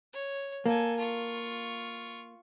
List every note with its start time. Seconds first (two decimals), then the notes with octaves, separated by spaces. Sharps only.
0.13 C#5
0.66 A#3 A4 G#5
0.99 F4 C#6